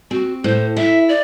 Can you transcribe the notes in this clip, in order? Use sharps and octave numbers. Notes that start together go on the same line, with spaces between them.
C4 F#4
A2 C5
E4 E5
D5